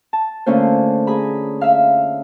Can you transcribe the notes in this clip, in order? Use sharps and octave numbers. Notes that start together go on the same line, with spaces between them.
A5
D3 A3 A#3 C#4 F4 C5
G#4 G#5 A#5 B5
E5 F5